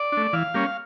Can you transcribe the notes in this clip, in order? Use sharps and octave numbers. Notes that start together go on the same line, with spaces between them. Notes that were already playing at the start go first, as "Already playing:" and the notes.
Already playing: D5
A3 D4
E3 F5
G3 A#3 C#4